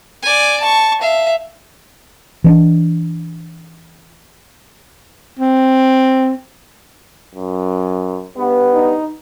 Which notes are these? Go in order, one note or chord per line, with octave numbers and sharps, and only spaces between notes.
D5 G#5
A5 C#6
E5 F5
E3 C#4 D4
C4
F#2
G2 B3
D#4